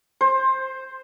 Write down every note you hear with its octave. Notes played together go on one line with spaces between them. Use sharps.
C5